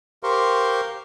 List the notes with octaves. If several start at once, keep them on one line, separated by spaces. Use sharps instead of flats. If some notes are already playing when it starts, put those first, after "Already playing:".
G4 A#4 C5 F5 C6 C#6